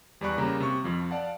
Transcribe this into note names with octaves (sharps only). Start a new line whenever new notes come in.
E2 G3 D5 B5 C#6 F#6
C#3 G3 A#3 A#5
C3 C#6
F2 F3
D5 F5 F#5 A5